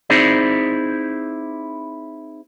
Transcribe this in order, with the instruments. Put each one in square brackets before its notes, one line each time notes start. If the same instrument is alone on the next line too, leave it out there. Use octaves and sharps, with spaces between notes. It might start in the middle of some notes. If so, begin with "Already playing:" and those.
[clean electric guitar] C4 D#4 E4 G#4 C5 D5